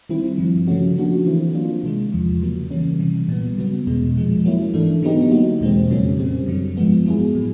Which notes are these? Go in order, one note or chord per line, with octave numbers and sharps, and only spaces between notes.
D#3 G3 C4 E4
G2 D3 F3
C#3 F3 A3 C#4 F#4
D3 F3 A#3 D4 F#4
E3 A3 C4 E4
F#3 A#3 D4 F4
C3 D#3 G#3
E2 C3 F3
C#3 F#3 A#3
C#3 E3 G3 A#3 C#4
C3 E3 G3
A#2 G3 B3
C#3 F#3 B3
E2 B2 G#3
A#2 F3 G#3
F#3 A#3 C#4 E4
G#2 E3 A3 D4
D3 F#3 B3 D#4 G4
F#3 A#3 D#4 F#4
E2 B2 G#3 C4
F2 C#3 F#3 A#3 C#4
A#2 G3 C4
F#2 D3 F#3
G#2 F3 G#3 B3
F#3 B3 E4 G#4
A2 F#3